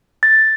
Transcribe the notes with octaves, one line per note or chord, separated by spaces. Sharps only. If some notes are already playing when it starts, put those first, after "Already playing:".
A6